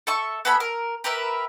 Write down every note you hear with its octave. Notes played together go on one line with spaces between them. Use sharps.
A4 E5 C#6
B3 G#4 A4 B5
A#4
G4 A#4 B4 E5